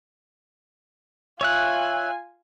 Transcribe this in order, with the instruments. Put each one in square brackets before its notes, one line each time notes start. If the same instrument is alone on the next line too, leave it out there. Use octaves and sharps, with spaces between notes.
[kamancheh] F4 G#5 [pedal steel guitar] C#5 E5 F#6